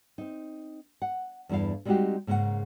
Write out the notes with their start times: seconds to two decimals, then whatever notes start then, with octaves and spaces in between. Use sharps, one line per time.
0.18 C4 D#4
1.02 F#5
1.49 E2 G2 E4 A4 F5
1.85 G3 G#3 C4 D#4 F#4 G4
2.27 G#2 C#3 A#3 B4 F#5